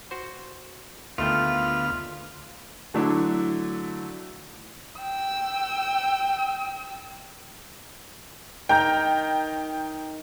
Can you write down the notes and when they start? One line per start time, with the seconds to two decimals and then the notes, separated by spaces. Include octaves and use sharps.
0.11 F#4 C5
1.18 D2 D#3 A3 B3 F4 G5 F6
2.94 D3 F#3 A3 D4 E4
5.01 G5 E6
8.69 D#3 G5 A#5 G6